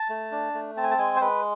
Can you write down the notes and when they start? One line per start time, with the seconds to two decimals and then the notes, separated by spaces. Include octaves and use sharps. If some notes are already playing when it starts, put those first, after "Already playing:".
Already playing: A5
0.09 A3
0.31 D4
0.55 A3
0.77 C4 A5
0.83 G#5
0.91 A5
0.98 G#3 G#5
1.16 C5
1.20 G#3 B4